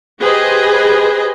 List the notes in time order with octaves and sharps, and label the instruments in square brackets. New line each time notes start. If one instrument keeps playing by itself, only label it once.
[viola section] G4 G#4 B4 C5 D#5 G#5